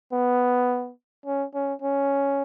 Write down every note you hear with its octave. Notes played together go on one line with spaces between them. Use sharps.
B3
C#4
C#4
C#4